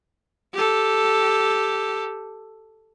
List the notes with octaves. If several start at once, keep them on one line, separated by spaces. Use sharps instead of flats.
G4 A4